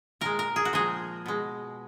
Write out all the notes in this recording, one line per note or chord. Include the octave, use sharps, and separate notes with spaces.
A#2 G#3 A#4
A#4
G#4
F#4
A#2 F3 G#3 G#4
B2 G#3